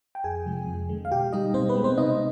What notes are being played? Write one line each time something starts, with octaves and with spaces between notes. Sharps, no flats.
G5
F2 G#4 G#5
C3 F3 G#3
F2
D3 G#3
F5
B2 G4 G5
G3 D#4 D#5
B2 C4 C5
B3 B4
G#3
C4 C5
C3 D#4 D#5